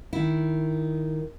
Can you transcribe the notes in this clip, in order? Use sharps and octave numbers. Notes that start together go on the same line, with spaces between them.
D#3 E4